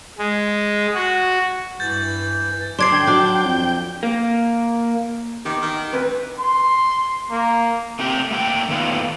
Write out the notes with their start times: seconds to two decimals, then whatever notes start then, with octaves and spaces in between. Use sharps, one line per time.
0.18 G#3
0.94 F#4
1.80 G2 E3 G6 A6
2.79 D4 D5 C6 G#6 C7
2.92 D3 G5
3.07 F#3 D4
3.45 F2
4.03 A#3
5.45 D#3 E3 B3 G4
5.62 D#3
5.93 D2 C4 B4
6.39 C6
7.31 A#3
7.99 A3 C4 G4 G5
8.31 A3 A#3 A#4 G5
8.69 E2 D#3 A3 B3 F4